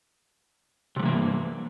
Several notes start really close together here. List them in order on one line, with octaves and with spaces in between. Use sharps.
C3 G3 E3 A#3 G2